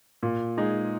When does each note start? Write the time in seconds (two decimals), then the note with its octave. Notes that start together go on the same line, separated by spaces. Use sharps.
0.23 A#2
0.57 G#3 D#4 G#4